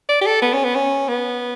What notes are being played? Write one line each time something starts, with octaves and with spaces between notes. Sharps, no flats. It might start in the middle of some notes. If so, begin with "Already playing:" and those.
D5
G4
A4
B3
C#4
B3
C#4
B3